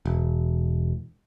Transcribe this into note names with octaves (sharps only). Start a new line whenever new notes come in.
E1